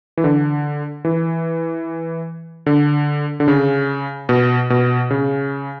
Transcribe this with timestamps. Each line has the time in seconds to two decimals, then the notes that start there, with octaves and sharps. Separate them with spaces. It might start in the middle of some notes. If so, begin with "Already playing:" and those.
0.17 E3
0.24 D3
1.05 E3
2.66 D3
3.40 D3
3.48 C#3
4.29 B2
4.70 B2
5.10 C#3